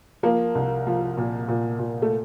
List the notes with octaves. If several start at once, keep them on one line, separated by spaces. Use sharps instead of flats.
F3 A#3
C2
F3
A#2
A#2
A#2
A3